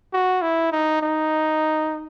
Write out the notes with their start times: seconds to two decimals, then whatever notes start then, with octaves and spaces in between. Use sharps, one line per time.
0.13 F#4
0.42 E4
0.72 D#4
1.02 D#4